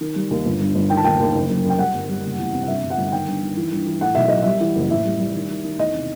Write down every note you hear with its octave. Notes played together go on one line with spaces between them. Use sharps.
D#3
G3
D#2
G1
G2
G1
D#3 G5
A5
D#2 G5
D#2
F#1
F#2
F#2
G5
G3 F#5
G1
G3
F#1
E2
C3
F#5
G2 E5
G1
F#5
G1
F#5
D#3 G5
G2
D#3
E3
G2
E3
A2 F#5
B1 E5
F#3 D#5
G3 E5
E3
F#1
A1 E5
G3
G3
D#3
D#3
D#3
E2 D#5
C3